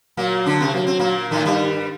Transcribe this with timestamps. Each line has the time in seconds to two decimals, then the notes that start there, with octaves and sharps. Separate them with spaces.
0.17 A#2 F#3 A#3
0.46 D3 D4
0.60 C3 C4
0.74 F#3 A#3
0.87 C4
0.99 A#2 A#3
1.31 A2 D#3 A3
1.45 G2 G3